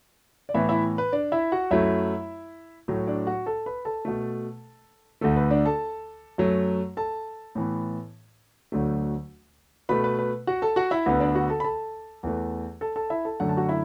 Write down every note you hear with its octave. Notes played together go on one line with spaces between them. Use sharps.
D5
A2 E3 B3 E4 E5
E4 E5
B4
D4 D5
E4 E5
F#4 F#5
F#2 F#3 A3 E4 E5
A2 F#3 A3
D4 D5
F#4 F#5
A4 A5
B4 B5
A4 A5
B2 A3
D2 D3 A3 A4
B4
D4 D5
A4 A5
F#2 F#3 A3
A4 A5
A2 E3 B3
D2 D3 F#3 A3
B2 A3 B4 B5
B4
B4
F#4 F#5
A4 A5
F#4 F#5
E4 E5
D2 D3 B3 B4
D4 D5
F#4 F#5
A4 A5
B5
A4 A5
E2 E3 A3
A4 A5
A4 A5
E4 E5
A4 A5
F#2 D3 A3 F#5
A5
F#4 F#5
E4 E5